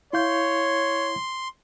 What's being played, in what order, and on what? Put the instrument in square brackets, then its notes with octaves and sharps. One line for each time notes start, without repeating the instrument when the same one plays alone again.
[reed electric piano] E4 F5 G6 [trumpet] C#5 [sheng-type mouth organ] C6